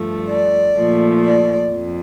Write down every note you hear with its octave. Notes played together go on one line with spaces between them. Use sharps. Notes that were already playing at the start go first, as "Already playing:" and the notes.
Already playing: G2 F3 A3
D5
A#2 F3 A3
D5
F2